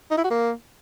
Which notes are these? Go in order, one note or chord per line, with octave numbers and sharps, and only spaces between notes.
D#4
E4
F#4
A#3